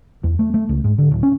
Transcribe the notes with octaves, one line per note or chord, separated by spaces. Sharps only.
E2
A3
A3
C#2
G#2
D3
D1
C#4